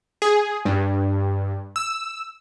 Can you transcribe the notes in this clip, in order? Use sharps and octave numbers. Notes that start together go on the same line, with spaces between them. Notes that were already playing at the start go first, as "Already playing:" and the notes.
G#4
G2
E6